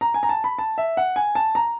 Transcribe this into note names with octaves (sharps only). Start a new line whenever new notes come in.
A#5
G#5
A#5
A5
B5
A5
E5
F#5
G#5
A5
A#5